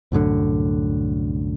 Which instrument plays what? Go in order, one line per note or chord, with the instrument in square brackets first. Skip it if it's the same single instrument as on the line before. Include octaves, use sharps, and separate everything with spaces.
[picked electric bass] C2 F#2 A2 D3